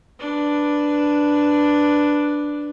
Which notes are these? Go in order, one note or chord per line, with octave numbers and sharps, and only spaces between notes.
D4 B4